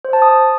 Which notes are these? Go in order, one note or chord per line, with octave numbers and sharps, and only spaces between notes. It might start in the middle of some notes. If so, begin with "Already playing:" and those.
C5
A5
D#6